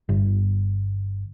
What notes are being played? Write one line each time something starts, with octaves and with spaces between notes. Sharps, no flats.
G1